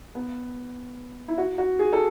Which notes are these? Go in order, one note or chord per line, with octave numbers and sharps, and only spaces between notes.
B3
E4
F#4
F#4
G#4
A4